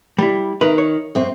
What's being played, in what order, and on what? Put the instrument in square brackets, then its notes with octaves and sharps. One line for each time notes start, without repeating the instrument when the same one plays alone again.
[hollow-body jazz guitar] G3 E4
[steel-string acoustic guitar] D#3 [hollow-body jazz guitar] A#4 B4
[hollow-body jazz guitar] C#5
[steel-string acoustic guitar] F#2 C4